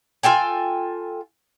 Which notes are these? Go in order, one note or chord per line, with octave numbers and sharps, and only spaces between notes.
F4 A4 G5 G#5